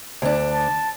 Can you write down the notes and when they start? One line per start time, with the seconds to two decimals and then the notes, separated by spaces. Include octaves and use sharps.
0.22 D2 D4
0.54 A5